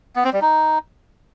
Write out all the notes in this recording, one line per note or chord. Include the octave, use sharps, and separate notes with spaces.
B3
C4
G3
D#4